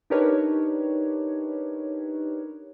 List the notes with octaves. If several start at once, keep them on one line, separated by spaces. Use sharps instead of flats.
D4 D#4 G4 A#4 B4 C#5